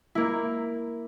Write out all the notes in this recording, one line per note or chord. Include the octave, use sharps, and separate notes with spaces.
A#3 E4